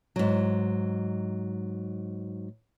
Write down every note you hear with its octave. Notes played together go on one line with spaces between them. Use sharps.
G#2 F#3